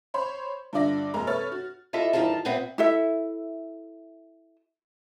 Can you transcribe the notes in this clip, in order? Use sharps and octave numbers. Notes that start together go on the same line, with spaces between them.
C5 C#5 B5 C6
G2 D3 F4 D5 E5 A#6
F1 G#3 A#3 A#5
A4 B4 C#5 E5 F6 A6
F#4
E4 F4 G4 A4 D#5 E5
G2 D#3 E3 F4 A5
A#2 B3 C4 B4 E5 F#5
E4 A4 E5